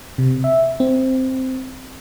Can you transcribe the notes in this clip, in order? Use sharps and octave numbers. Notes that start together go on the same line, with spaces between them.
C3
E5
C4